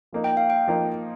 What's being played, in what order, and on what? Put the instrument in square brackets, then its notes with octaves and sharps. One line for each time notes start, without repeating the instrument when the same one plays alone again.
[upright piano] F3 A#3 D#4
[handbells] G5
F5
G5
[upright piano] F3 A#3 D#4